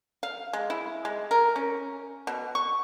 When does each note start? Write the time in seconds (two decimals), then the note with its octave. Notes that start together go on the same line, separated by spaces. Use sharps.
0.23 F5
0.53 G#3
0.70 E4
1.05 G#3
1.31 A#4
1.56 C#4
2.27 B2
2.55 C#6